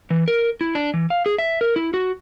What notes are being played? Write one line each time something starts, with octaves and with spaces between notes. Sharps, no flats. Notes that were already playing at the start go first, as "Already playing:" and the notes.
E3
A#4
E4
D4
E3
F5
G#4
E5
A#4
E4
F#4